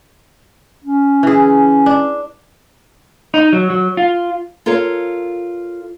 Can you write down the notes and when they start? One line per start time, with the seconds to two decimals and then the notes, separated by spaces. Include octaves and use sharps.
0.84 C#4
1.23 E3 G#4
1.86 D4
3.34 D#4
3.53 F#3
3.70 F#3
3.97 F4
4.66 F4 A4 A#4 C#5 F5